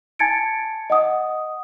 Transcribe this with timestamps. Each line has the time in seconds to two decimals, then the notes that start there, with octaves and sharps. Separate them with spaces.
0.19 G#5 A5 G#6 A6 C#7 D7
0.90 D#5 F#5 D#6